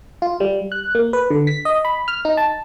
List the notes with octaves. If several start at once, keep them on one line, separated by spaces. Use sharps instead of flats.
F4
G3
F#6
A#3
B4
D3
B6
D#5
B5
F6
D#4
A5